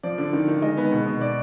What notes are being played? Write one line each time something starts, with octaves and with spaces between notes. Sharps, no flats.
F3 D5
D3
D#3
D#3
G#3 D#5
B3
B2
B2
D5